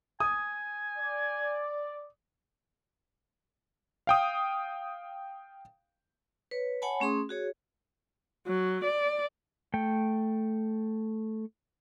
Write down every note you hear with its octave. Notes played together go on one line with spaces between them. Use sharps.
G#5 D#6
D5
F5 G5 D#6
B4 C#5
C#5 F#5 G#5 A5 B5
A3 C#4 G#4 C6 D#6
F#4 G#4 C#5
F#3
D5
A3 G5